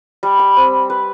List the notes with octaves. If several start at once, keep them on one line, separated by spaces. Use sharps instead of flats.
G3
B5
C4
B4